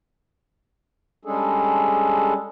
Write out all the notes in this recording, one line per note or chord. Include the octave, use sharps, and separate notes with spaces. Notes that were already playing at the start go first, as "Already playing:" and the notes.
G3 G#3 C#4 D4 G#4 A4